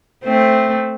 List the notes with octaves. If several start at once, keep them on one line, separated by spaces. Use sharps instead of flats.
A3 C4